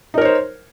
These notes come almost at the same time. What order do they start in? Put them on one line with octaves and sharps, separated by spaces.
D#4 A#4 C#5 C5